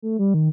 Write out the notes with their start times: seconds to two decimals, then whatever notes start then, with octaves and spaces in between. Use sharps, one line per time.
0.02 A3
0.19 G3
0.34 D#3